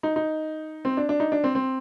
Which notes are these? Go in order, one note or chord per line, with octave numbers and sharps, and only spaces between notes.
D#4
D#4
C4
D4
D4
D#4
D4
C4
C4